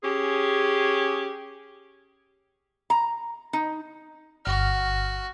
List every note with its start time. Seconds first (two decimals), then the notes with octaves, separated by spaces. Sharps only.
0.03 C#4 G4 G#4
2.90 A#5
3.53 D#4
4.45 G1 F#4 F6